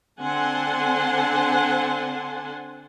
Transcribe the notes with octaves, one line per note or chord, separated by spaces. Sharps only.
D3 C4 F#5 G#5 A5 C6